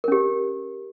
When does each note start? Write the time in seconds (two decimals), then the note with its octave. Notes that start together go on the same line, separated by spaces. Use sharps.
0.04 A#4
0.08 C#4
0.12 G4